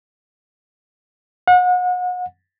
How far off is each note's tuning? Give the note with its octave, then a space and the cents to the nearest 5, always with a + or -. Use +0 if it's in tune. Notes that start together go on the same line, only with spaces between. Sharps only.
F#5 -35